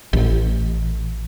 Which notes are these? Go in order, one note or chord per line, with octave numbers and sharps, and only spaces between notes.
A1